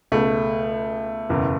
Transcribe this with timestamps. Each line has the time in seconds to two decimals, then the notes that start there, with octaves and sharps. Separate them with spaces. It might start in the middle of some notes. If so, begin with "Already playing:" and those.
0.12 C#2 B2 G#3 A3
1.29 F#1 E2 B2